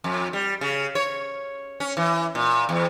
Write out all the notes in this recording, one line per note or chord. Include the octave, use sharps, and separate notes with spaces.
F2
G3
C#3
C#5
C#4
E3
A#2
E2